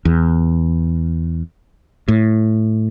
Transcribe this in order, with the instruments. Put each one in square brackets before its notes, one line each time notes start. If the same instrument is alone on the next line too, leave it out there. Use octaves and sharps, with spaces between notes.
[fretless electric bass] E2
A2